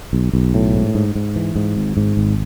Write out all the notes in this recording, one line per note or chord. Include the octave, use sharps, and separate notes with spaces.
B1
B1
A2
G#2
G#2
G#2
E3
G#2
G#1
G#2
G#1